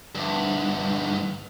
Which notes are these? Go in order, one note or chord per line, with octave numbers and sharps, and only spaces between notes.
D2 G2